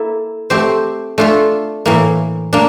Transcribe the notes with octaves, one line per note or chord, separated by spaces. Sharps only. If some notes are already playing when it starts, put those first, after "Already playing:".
Already playing: A#3 E4 A4
A3 C4 G4 C5
A3 D4 F4 A4
A2 E3 A#3
A#3 D4